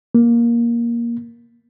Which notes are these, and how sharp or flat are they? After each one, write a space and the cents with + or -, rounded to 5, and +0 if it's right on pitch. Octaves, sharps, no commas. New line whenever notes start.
A#3 +10